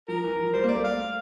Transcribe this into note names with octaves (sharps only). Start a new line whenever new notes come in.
F3 A#4
E3
F3
G3 C5
A#3
D5
A3
F5